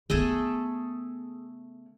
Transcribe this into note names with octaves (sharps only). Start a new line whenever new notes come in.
C#3 A3 B3 G#4 A4